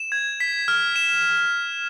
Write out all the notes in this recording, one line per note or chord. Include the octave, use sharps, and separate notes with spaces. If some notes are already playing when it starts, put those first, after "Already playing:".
Already playing: E7
G#6
B6
F6
E7